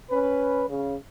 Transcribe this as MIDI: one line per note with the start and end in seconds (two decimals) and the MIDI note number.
0.11 0.64 61
0.11 0.64 71
0.69 0.95 49